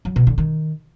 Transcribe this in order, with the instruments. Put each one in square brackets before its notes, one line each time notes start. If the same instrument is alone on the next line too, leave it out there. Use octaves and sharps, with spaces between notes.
[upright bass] F#3
B2
D3
D#3